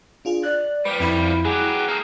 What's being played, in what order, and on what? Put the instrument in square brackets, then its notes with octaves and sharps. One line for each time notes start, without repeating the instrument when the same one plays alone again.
[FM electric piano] D4 F4 G#4
[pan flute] D5 [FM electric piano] F#6
[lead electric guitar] F3 G3 [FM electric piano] B4
[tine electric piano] F2 E5 B5 [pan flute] E4
[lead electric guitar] F#3 G4 [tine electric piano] G#4 G#5 F#6
[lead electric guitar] A#3 A4 [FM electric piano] D#6 F6